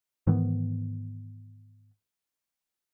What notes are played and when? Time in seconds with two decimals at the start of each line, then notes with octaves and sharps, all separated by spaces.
0.27 G#2 D#3 E3 B3